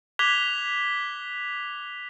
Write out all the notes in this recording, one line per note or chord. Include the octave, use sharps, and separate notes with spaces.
D6 F#6 G#6 B6 F7 G7